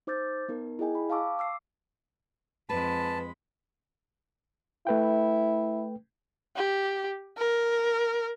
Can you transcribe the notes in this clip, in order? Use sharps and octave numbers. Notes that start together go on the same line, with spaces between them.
D#4 C5 D6 E6 G6 A6
B3 D#4 A#4
E4 G#4 D#5 G5 G#5
B5
F5 G5 A5 C#6 D6 E6
D6 E6 C7
F2 G#3 B4 A5 B5
A3 E4 B4 G5
G4
A#4